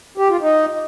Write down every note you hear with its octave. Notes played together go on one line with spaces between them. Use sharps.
G4
F4
D#4